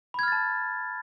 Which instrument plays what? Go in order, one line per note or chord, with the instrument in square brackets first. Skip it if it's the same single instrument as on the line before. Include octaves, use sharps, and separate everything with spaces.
[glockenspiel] B5
G#6
F6
A6
A5